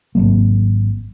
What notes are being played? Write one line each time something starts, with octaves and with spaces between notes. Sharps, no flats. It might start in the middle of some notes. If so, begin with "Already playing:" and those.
G#1 D#2 F#3 A#3